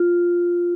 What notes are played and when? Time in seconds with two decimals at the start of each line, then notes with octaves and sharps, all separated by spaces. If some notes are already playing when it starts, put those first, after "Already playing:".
Already playing: F4